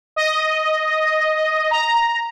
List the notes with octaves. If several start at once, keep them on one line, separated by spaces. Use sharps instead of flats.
D#5
A#5